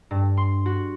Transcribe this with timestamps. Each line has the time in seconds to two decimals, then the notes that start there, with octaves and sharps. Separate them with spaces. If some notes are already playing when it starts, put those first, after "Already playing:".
0.11 G2
0.37 C6
0.66 F#4